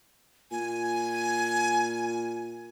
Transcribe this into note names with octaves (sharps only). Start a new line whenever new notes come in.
A#2 G#5